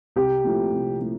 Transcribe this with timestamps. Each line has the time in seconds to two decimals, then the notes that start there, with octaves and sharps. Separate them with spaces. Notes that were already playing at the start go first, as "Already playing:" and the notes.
0.16 C2 G4
0.44 A#2 F3 A3 E4
0.72 C2
1.00 A#2 F3 A3 E4